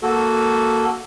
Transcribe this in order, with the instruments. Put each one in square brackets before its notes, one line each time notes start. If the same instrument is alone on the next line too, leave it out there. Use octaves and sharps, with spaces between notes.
[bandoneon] A#3 F#4 A4